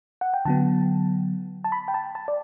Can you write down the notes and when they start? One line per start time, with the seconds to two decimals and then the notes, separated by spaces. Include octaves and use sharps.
0.21 F#5
0.34 G5
0.45 D3 F#3 B3 A5
1.64 A5
1.72 B5
1.88 G5
1.94 A5
2.15 A5
2.28 D5